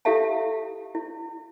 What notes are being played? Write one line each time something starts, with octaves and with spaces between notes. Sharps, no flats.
E4 G4 A4 E5 F5 A5
E4